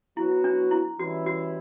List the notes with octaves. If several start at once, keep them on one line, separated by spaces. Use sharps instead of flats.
F#3 B3 E4 F#4
D4
E4
E3 G3 C#4 E4 F#4
F#4